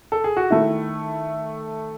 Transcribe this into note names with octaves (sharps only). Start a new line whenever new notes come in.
A4
G#4
F#4
D#3 A3 E4